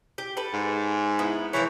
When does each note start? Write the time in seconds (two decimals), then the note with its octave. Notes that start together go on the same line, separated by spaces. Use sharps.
0.18 G4
0.37 A4 B4
0.54 G#2
1.19 B3 E4
1.53 E3 F3 A#4 C#5